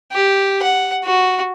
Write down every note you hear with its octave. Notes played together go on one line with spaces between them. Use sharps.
G4
F#5
F#4